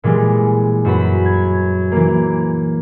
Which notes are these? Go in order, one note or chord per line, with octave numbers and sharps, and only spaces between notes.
A#2 E3 G3 G#3
F#2 F#4 B4 B5
G#6
E3 A#3